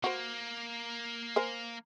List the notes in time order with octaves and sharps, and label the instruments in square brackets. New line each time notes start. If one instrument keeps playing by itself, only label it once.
[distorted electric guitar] A#3 [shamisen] F#4 C5
[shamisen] A#4 C5 G#5